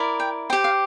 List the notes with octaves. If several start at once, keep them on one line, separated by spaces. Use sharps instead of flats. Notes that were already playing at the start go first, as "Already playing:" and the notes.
Already playing: E4 A#4 D5
G5
G4 C5 G5
F5